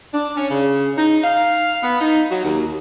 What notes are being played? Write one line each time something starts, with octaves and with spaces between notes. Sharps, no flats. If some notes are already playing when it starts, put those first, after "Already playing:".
D4
C#4
C#3
D#4
F5
B3
D#4
F#3
D#2